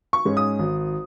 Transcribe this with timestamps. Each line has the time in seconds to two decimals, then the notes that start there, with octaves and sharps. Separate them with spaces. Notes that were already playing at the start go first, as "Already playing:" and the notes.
0.13 C#6
0.25 G#2 G#3 C#4
0.37 D#6
0.59 G#1